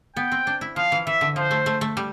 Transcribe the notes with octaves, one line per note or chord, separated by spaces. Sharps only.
B3 G5
C4
D4
E4
F3 F5
E3
E3 E5
D3
F3 C5
A3
A3
A3
G3